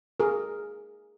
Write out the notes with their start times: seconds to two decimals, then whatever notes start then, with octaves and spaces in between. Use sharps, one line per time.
0.20 G#4 A#4